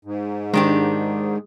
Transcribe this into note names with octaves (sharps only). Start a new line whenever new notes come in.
G#2
D#3 G#3 D4 G4